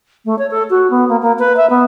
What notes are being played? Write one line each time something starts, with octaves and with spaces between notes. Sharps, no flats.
A3
C#5
A4
F#4
B3
A#3
A#3
B4
E5
B3